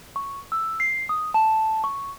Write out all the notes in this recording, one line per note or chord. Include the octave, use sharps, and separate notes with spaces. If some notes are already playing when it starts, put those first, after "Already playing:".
C#6
E6
C7
D#6
A5
C#6